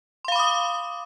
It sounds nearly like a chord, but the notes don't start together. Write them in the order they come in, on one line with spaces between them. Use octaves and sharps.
C6 F5 B5 D6 D#6